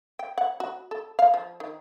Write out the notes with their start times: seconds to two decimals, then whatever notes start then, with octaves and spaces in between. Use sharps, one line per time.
0.19 G5
0.38 F#5
0.60 F#4
0.91 A4
1.19 F5
1.34 F3
1.60 D#3